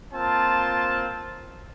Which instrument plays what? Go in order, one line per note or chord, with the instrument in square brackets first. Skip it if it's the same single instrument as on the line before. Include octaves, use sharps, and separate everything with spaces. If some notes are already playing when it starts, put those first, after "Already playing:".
[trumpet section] A#3 C4 F4 A5